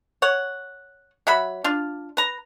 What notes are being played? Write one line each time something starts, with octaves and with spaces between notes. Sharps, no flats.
C#5 F#5
F#3 E5 F#5 B5
D4 F4
B4 A#5